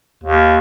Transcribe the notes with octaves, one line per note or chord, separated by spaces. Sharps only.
D#2